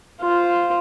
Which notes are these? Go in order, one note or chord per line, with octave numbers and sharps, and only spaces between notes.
F4 C5